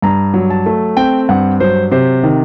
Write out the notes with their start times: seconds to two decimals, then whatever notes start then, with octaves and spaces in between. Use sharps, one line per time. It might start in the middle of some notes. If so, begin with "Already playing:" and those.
0.02 G2 A#5
0.34 F#3
0.50 A5
0.66 A3
0.97 C4 G5
1.29 G2 F#5
1.60 F#3 C5
1.92 C3 C5
2.23 D#3